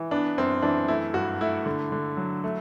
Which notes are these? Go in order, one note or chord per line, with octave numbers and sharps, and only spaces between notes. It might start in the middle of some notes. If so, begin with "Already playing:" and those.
Already playing: E3
B3 D4
F#2 C4
E3 D4
A3 E4
G2 F#4
A3 E4
D3
D3
F#3
A3